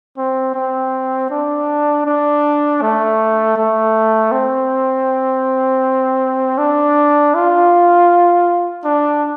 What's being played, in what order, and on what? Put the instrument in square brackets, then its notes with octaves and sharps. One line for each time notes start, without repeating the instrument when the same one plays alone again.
[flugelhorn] C4
C4
D4
D4
A3
A3
C4
D4
F4
D4